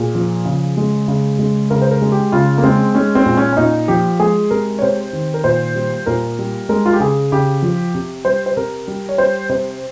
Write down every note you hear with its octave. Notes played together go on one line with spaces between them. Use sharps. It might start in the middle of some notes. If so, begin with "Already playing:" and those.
Already playing: A#2 G#4
F3
C#3
G#3
C#3
G#3
C#3 A#4
C5
A#4
G#3
G4
C#3 F4
A#3
G#3 C4
G#3 C#4
C4
A#2
C#4
C#4
A#2 D#4
F3 G4
G#3 G#4
C3 A#4
C#5
C3 C5
D#3
A#4
A#2 C5
G3
A#2 A#4
G3
G#3 A#4
F4
G4
C#3 G#4
C#3 G4
F3
C3
G3 C5
C5
C3 A#4
G3
C#5
G3 C5
C3 C5